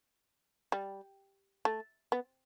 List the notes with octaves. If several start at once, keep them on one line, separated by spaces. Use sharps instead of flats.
G3
A3
B3